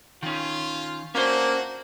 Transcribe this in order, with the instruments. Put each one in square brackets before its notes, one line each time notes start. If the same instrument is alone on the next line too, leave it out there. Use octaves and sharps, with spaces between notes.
[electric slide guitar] D#3 C#4 [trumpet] F4
[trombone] A#3 [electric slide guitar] C#4 D4 C5 [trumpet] F#4